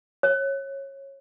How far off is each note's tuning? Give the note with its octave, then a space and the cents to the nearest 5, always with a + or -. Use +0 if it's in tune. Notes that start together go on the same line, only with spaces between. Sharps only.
C#5 -20